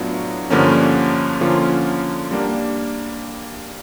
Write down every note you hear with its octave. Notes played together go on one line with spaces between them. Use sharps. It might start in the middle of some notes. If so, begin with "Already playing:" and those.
Already playing: A2 F#3 B3 D4 F4
G2 D3 F3 A#3 C#4
D3 F3 A#3 C#4 F4
G3 A#3 D4